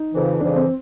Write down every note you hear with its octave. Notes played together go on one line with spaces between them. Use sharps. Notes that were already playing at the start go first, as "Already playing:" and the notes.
Already playing: D#4
F2 C#3 E3
F2 C#3 E3 D4
C4